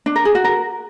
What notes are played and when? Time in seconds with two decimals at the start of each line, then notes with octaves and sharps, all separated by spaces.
0.06 D4
0.16 A#4
0.25 G#4
0.35 F#4
0.44 A#4